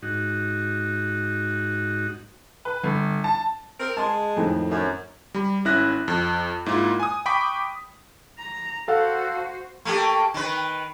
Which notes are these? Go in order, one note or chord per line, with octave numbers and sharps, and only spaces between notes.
G#2 D#4 F#4
B4
G1
A5
C4 A#4
G#3 A5 C6
F2 A2 D#3
F#2
G3 B5
G#1 C#4 E4 F#6 A#6
F2
G#2 A#3 E4 F4
G#5 D#6
G5 B5 C#6 D6 B6
A#5
F#4 A4 C5 F5 F#5
A3 A#3 G4
D#3 B4